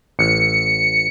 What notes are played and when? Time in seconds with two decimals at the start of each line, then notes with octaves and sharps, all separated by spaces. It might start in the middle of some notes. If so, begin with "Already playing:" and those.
0.19 A1 C#7